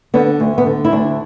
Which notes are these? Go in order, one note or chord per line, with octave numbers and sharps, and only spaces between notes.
D3 B3
D2
B3
D3
E4
D2 D4